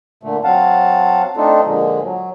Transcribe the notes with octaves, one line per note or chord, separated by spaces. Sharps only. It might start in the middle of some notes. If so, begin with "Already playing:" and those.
A#2 D3 A3
F#3 C4 F5 F#5 A5
A3 C4 D4 D#4 F4 A4
A#2 D3 F3 G#3
F#3